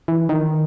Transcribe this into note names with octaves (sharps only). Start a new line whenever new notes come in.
E3
D#3